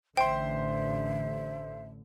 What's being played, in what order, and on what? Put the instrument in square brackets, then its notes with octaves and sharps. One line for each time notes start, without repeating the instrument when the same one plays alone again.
[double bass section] A1 D3 [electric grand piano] C5 C6 [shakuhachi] E5 [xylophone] G5